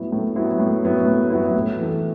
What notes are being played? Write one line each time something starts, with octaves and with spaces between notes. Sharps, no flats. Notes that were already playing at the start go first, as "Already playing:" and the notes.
Already playing: A2 F#3 B3 E4
A2
F#3 B3 E4
A2
F#3 B3 E4
A2
F#3 B3 E4
A2
E3 A3